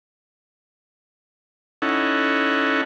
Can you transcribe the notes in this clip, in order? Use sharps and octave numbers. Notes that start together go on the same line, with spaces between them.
C#4 D#4 E4 A4 F#5